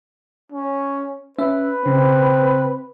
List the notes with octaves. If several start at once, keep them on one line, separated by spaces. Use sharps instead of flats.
C#4
C#4 B4 E5
C#3 C4